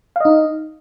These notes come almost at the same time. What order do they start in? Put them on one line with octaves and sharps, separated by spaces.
F5 D#5 D#4